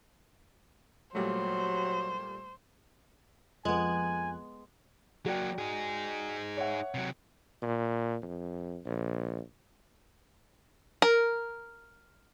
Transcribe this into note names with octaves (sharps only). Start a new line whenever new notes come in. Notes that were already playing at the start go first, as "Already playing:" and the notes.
A#2 F#3 G3 A3 C5
F2 G#3 B3 G#5 F#6 G#6
F#3 A#3 F#4 D5 G5
D#4 G#4
C#5 E5 F#5
C3 F#3
A#2
F2
A#1
A#4